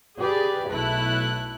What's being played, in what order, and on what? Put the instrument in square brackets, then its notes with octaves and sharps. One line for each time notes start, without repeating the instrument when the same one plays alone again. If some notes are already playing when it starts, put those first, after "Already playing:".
[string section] G4 G#4 B4 D5
B1 A3 E4 F#6